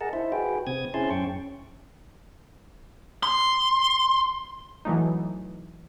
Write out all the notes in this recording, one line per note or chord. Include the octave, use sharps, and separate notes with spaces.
G#4 A#4 D#5 F#5 A5
D#4 E4 C5 E5
F#4 G#4 B4 G5
C3 C4 D#6 G#6
C#4 E4 G#4 C5 A5 C6
F#2 C#4 G5 C#6
C6
E3 F#3 A3 D#4